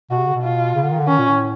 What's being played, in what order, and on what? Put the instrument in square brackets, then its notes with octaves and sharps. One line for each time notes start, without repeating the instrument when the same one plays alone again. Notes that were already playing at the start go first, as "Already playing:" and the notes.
[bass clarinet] B2 [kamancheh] F#4
[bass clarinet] C3
C#3
B2
[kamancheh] F4
[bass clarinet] C#3
D3
D#3
D3
[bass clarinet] D#3 [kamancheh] C#4
[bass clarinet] A#2
A2